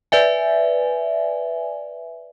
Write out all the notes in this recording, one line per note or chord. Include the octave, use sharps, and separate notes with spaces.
B4 D5 E5 G#5